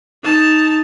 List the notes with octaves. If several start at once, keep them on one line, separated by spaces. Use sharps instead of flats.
D#4 A5